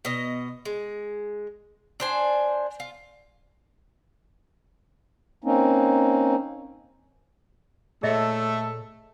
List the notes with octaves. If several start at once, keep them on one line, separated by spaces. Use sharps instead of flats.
B2 D#5
G#3
D4 C5 G#5
F4
A#3 C4 C#4 D#4
A#2 A3 G#4 A4 C#5 D#5 E5